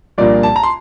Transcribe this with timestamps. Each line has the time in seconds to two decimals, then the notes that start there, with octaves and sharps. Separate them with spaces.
0.18 C2 A#2 F3 A#3 D4 D5
0.43 A5
0.56 A#5
0.63 C6